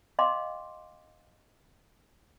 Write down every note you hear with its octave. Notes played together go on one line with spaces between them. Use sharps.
D#5 F5 G5 A#5 C6 D6